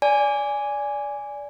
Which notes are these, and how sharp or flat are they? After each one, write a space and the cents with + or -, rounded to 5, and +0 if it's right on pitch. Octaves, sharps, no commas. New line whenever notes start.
D5 -15 G#5 +0